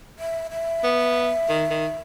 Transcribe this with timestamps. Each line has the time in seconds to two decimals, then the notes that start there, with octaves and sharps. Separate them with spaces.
0.19 E5
0.51 E5
0.84 B3
1.49 D#3
1.70 D#3